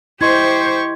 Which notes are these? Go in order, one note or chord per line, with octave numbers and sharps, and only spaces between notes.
E4 G4 C5 D#5 C6 C#6 G#6